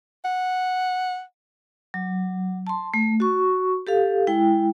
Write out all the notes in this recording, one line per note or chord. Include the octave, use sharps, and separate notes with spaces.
F#5
F#3
A5 C6
A3
F#4 C#6
G4 A4 F5
G#3 E4 G5